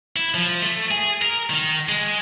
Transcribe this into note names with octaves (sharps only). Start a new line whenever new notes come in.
E4
F3
A3
G#4
A#4
D#3
G#3